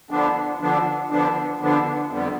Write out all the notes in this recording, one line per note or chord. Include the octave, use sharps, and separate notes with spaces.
D3 F3 B3 D4
D3 F3 B3 D4
D3 F3 B3 D4
D3 F3 B3 D4
F2 D3 G3 B3